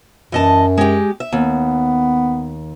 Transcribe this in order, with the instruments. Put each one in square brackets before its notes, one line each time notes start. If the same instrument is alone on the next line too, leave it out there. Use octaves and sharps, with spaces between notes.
[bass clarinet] F#2 [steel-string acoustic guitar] E3 D#5 A5
[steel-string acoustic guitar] G#3 G4
E5
[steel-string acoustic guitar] D#2 [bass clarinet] B3